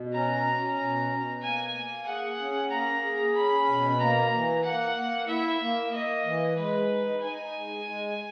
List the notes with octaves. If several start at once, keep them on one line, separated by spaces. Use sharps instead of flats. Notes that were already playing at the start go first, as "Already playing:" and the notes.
Already playing: B2
C#4 A#5
C#4
B2
B2
A#3 G#5
A#3
G#4 F#5
C#4
A#3 A#5
G#4
C#4 B5
B2
A#3 A#5
E3
A#3 F#5
A#3
E4 E5
A#3
A#3 D#5
E3
G#3 B4
D#4
D#4 G#5
G#3
G#3